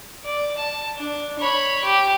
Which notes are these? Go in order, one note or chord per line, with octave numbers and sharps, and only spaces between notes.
D5
A5
D4
C#5 B5
G4